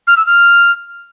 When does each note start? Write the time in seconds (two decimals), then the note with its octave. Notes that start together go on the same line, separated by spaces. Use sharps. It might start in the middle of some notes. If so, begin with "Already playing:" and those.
0.07 F6
0.17 E6
0.26 F6